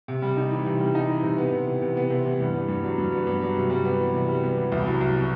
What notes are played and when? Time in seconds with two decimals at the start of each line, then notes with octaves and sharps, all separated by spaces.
0.08 C3
0.22 G3
0.37 D#4
0.51 E3
0.66 C3
0.81 G3
0.95 D#4
1.09 E3
1.23 C3
1.38 B3
1.52 C3
1.67 E3
1.82 C3
1.97 B3
2.10 C3
2.26 E3
2.40 G2
2.54 B3
2.68 G2
2.83 F#3
2.98 G2
3.12 B3
3.27 G2
3.41 F#3
3.56 C3
3.70 G3
3.85 B3
4.00 E3
4.14 C3
4.28 G3
4.44 B3
4.57 E3
4.72 C2
4.86 F#3
5.01 C2
5.16 B2